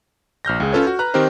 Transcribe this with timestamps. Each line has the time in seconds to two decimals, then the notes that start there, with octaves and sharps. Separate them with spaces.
0.45 A#1 F6 G6 A#6
0.60 C#2 G#4
0.73 C#4 F4 A4 B4 C#5
0.87 F#4
0.99 B4 A#5 F#6
1.14 D#3 C4 D#4 G4 A#4 C5